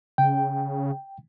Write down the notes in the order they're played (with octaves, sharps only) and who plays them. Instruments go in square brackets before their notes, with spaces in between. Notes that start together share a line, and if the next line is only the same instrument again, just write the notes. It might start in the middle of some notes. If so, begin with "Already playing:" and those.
[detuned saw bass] C#3 [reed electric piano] G5